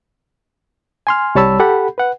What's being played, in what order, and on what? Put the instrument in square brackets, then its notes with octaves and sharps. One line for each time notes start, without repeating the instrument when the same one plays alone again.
[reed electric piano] G#5 C6 F6
C2 G3 C#5 A5 B5 E6
G4 A4 F#5 B5
B4 F#5